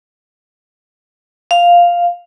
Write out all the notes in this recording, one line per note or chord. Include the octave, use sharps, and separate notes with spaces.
F5